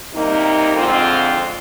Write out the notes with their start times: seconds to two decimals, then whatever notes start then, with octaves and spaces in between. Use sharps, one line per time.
0.12 C3 G3 A#3 D#4
0.74 F2 D3 G#3 C4 F4